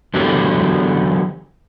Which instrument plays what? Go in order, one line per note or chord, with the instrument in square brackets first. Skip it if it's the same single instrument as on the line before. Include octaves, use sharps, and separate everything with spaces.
[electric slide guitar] D3 E3 F#3 B3 G4 A4